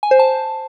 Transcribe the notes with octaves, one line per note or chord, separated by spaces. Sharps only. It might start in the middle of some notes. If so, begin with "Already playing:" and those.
G#5
C5
A5